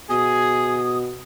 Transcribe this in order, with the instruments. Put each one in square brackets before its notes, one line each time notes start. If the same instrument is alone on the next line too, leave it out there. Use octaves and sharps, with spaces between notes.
[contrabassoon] B2 [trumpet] G#4 [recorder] D#6